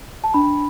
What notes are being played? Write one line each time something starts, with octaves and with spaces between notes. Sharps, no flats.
A5
D4 B5